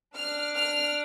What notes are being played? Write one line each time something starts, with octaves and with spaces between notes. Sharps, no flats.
D4 F6
F6